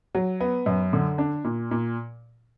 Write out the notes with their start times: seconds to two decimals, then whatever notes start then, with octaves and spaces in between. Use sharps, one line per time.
0.15 F#3
0.40 B3
0.66 F#2
0.93 D3
1.18 D4
1.44 A#2
1.71 A#2